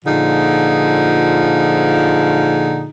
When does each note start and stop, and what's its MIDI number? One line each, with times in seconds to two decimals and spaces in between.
0.05 2.89 46
0.05 2.89 50
0.05 2.89 53
0.05 2.89 63
0.05 2.89 65
0.05 2.89 68